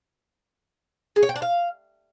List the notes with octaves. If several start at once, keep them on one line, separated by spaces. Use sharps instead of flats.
G#4
C#5
G5
D4
F5